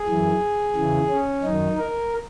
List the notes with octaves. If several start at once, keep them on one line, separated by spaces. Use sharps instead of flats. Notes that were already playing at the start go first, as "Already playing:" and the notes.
Already playing: G#4
F#2 E3
E2 C#3 E3
C#4
F#2 D#3 D#4
A#4